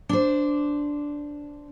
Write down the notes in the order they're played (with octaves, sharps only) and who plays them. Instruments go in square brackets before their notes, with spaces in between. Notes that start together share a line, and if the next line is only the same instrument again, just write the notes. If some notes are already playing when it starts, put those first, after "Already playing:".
[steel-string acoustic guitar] D4 C5